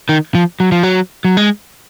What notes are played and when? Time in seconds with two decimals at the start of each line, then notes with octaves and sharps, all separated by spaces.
0.09 D#3
0.35 F3
0.60 F#3
0.72 F3
0.83 F#3
1.25 F#3
1.37 G#3